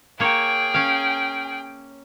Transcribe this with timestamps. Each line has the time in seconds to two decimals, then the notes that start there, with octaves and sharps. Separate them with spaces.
0.20 A#3 G#4 C#5 G5
0.74 C#4 F5